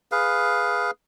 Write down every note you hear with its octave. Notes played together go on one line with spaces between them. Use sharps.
G#4 B4 F5